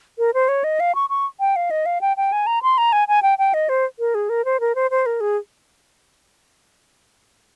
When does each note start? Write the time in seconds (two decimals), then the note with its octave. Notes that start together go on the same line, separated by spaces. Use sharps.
0.19 A#4
0.34 C5
0.48 C#5
0.64 D#5
0.80 F5
0.95 C#6
1.10 C#6
1.40 G5
1.56 F5
1.71 D#5
1.86 F5
2.01 G5
2.17 G5
2.32 G#5
2.47 A#5
2.63 C6
2.78 A#5
2.93 G#5
3.08 G#5
3.23 G5
3.38 G5
3.54 D#5
3.69 C5
3.99 A#4
4.15 G#4
4.29 A#4
4.45 C5
4.60 A#4
4.75 C5
4.91 C5
5.06 A#4
5.21 G#4